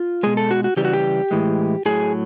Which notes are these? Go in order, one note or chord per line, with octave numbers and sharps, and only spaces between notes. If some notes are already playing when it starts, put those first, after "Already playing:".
Already playing: F4
B2 G#3 G#4
A4
F#4
F#4
C#3 E3 G3 G4
F#4
G4
A2 E3 G#3
A2 F#3 G#4